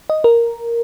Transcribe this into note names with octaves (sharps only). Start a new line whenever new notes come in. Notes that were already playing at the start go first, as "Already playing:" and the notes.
D#5
A#4